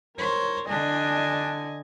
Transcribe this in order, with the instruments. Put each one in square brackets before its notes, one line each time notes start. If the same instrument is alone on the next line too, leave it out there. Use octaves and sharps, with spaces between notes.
[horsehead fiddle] A#4 C#5 [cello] C5
[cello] D3 [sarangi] D4 [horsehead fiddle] D#5 G#5